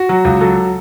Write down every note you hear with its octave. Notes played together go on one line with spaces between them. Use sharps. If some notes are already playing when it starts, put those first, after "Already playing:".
Already playing: F#4
F#3
C#2
F#3 A4